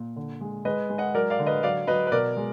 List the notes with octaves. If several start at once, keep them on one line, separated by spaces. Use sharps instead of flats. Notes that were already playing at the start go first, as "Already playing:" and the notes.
Already playing: A#2
D3
G#3
G#3 B4 D#5
G#3
D#5 F#5
F#3 A#4 D5
D5 F5
D3
B4 D#5
F#3 D5 F5
F#3 B4 D#5
B4
B2 A#4 D5
G#3